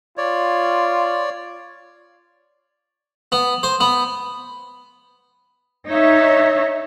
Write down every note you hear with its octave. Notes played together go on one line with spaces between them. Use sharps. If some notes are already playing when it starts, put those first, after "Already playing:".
F4 C#5 D5
B3
C5
B3
D#4 C#5 E5